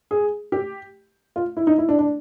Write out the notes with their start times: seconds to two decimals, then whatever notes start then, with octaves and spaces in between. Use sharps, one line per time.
0.11 G#4
0.52 G4
1.36 F4
1.57 E4
1.67 D#4
1.78 E4
1.89 D4
1.99 D4